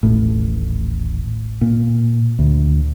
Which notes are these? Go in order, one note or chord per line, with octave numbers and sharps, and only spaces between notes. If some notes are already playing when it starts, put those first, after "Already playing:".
D#1 A1 A2
A#2
D2